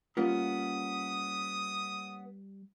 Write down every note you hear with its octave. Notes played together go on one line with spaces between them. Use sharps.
G3 A#3 B3 C#4 F4 D#6